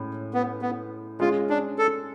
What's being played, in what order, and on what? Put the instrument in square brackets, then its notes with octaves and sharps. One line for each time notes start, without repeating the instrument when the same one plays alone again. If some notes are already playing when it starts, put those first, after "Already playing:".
Already playing: [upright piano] A2 G#3 C#4
[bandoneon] B3
B3
[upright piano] G#3 C#4 G#4 [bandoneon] F4
[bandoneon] D4
A4